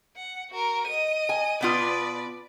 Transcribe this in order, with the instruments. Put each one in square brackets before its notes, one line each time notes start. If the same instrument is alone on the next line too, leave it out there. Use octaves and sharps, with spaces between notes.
[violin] F#5
F#4 A#4
D#5 D#7
[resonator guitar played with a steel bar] G#5
[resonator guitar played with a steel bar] B2 B3 F4 [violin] B4 D5